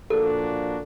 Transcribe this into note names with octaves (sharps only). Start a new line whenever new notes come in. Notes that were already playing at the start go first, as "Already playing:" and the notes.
A#2 F3 A#3 D4 F#4 A4